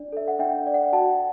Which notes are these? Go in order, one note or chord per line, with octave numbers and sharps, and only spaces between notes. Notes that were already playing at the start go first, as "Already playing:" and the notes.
Already playing: D4 D5
A4 E5
F#5
D4 E5 G5
D5
F#5
G5
F#4 F#5 A5